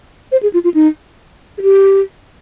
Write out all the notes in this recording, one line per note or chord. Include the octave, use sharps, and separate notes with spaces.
C5
G#4
F4
F4
D#4
G#4
G4